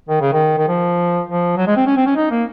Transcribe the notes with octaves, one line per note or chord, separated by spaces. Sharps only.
D#3
C#3
D#3
D#3
F3
F3
F#3
G#3
C4
C#4
C4
C#4
D#4
A#3